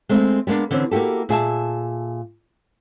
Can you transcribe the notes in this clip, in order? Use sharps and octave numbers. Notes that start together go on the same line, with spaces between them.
G#3 A3 C4
G3 G#3 A#3 B3 D4
D3 E3 C4 C#4
A#3 E4 F#4 G4 A4
A#2 G#4 E5 A5